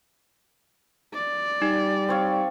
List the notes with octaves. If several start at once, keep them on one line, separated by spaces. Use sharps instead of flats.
D5
G3 D#4
C4 C#5 F5